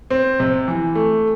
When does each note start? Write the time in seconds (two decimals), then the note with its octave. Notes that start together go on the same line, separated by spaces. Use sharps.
0.10 C4
0.40 C3
0.68 E3
0.95 A3